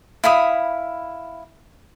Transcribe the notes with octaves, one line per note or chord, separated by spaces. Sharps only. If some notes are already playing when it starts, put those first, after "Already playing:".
E4 F5 B5 D#6